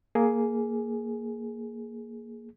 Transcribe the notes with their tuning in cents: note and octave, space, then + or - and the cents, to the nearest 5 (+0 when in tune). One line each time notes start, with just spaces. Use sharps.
A#3 +0 G#4 +10